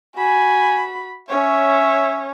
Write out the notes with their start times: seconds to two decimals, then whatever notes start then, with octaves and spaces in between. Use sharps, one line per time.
0.16 F#4 G#5 B5
1.29 C#4 C#5 E5